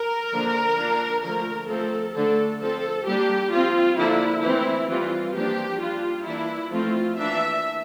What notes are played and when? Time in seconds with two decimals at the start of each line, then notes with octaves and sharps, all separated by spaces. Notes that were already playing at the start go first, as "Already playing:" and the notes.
Already playing: A#4
0.32 D3 F3 A#3 D4
0.78 F3 A#3 D4
1.23 D3 F3 A3 A#4
1.69 F3 A3 C4 A4
2.15 D3 A3 D4 A4
2.61 F3 C4 A4
3.06 G3 A#3 D4 G4
3.52 F3 C4 F4
3.97 D3 F3 A#3 D4 E4
4.43 E3 A3 C4 E4
4.89 E3 G3 C4 F4
5.35 F3 A#3 D4 G4
5.80 G3 D4 F4
6.26 E3 A#3 D4 E4
6.72 F3 A3 C4 F4
7.18 E3 A#3 D4 E5